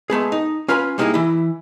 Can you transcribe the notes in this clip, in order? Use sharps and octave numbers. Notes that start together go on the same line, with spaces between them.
G#3 A3 B3 G#4
D#4
C#4 F4 B4 G#5 A#5 B5
G3 A#3 D#4 E4 F#4 G#4
E3 E4